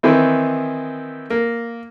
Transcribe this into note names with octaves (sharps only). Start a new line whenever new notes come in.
D#3 E3 B3 C4 E4
A#3